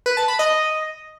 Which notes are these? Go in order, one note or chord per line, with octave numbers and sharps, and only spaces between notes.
B4
A5
B5
D#5